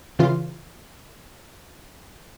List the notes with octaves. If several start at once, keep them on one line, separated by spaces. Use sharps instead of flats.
C#3 E3 F4